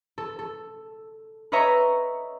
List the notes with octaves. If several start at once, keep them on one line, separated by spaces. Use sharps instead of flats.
A4
A4
B4 C#5 D#5 E5 A#5 C#6